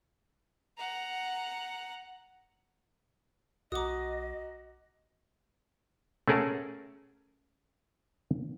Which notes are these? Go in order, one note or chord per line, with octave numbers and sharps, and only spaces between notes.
F#5 A#5
B1 F#4 D#5 A#5 D6 D#6
A3 C#4 G#4 A#4 F#5 A5